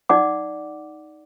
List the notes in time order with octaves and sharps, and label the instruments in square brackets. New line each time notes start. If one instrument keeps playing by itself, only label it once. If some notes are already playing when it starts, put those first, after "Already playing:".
[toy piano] D#4 D5 F#5 D6